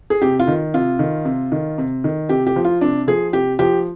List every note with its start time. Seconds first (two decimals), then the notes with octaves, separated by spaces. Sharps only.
0.10 G#4
0.22 C3 G4
0.40 F4
0.48 D#3
0.74 C3 F4
0.99 D#3
1.25 C3
1.52 D#3
1.78 C3
2.04 D#3
2.29 C3 G4
2.47 G4
2.56 F3
2.65 F4
2.81 C3 D4
3.08 F3 G#4
3.33 C3 G4
3.59 F3 G4